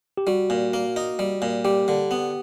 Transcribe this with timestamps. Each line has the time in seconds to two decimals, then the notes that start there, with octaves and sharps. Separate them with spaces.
0.17 G4
0.27 G3 F#4
0.50 A#2
0.74 A#3
0.96 D#4
1.19 G3
1.42 A#2
1.65 G3 G4
1.88 D3
2.11 B3